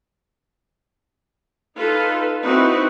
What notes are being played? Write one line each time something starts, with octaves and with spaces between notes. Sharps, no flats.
D#4 F4 A4 B4
C4 D#4 E4 F#4 B4